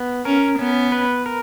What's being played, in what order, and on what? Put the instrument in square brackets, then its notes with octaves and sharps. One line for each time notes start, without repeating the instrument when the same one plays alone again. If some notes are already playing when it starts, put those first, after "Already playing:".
Already playing: [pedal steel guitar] B3
[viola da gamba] C#4 [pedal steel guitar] A#4
[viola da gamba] B3 [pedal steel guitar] C#4
[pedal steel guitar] B4
A#4